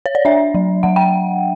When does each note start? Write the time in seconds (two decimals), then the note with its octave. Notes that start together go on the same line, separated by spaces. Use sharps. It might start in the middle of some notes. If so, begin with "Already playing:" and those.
0.06 C#5
0.15 D5
0.25 D4 E5
0.55 F#3
0.83 F#3 F#5
0.96 G5